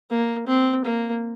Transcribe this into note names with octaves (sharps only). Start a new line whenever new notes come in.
A#3
C4
A#3